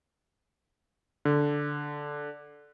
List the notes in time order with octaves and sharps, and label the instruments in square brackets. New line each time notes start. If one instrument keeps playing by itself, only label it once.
[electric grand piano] D3